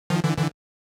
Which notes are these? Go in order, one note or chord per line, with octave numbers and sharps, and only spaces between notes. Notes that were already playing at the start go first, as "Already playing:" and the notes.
D#3 F3
D3 E3
D3 E3